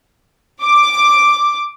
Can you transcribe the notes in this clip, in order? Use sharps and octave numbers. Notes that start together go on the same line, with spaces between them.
D6